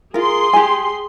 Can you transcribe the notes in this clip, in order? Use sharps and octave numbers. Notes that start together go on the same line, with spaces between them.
F4 G#4 A#4 C6
G4 G#5